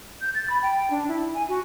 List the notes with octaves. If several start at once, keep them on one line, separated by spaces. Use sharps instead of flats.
G6
A6
B5
G5
D4
E4
G#5
F#4